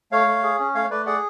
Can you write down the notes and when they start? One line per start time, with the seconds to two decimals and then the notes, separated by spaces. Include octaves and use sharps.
0.12 A3 C#5 F5
0.27 A3
0.43 G#4
0.60 C#4
0.75 A3 C#5 F5
0.90 A3 B4 D5
1.06 G#4 D5 F#5